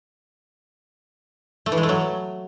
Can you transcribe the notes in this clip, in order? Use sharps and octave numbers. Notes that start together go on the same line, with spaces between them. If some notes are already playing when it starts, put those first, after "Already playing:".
A3
E3
G#3
A3
F#3